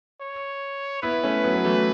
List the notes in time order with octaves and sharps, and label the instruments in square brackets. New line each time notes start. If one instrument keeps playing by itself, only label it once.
[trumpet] C#5
[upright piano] B3 E4 [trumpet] B4
[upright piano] A3 C#4
F#3 B3
F#3
E3 A3